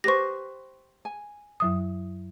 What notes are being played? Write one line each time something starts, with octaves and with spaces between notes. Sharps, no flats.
G4 B4 C5 C#6 A#6
G#5
F#2 F#3 D#6